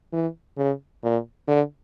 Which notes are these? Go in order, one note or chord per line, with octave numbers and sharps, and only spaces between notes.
E3
C#3
A#2
D3